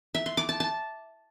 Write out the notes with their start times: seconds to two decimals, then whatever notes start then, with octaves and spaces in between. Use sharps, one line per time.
0.15 E5
0.26 C6
0.37 D6
0.49 A5
0.60 A5